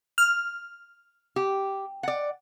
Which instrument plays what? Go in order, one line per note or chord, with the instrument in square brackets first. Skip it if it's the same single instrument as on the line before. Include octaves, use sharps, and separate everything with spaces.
[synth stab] F6
[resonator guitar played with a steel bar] G4
D5 F#5